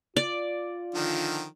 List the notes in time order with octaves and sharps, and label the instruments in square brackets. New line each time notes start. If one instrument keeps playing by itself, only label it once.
[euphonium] F4 [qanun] D5
[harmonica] D3 D#3 F3